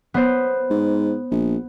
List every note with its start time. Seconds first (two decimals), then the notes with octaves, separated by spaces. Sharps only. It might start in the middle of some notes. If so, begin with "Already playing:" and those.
0.14 B3 C5
0.70 G#2
1.31 A#1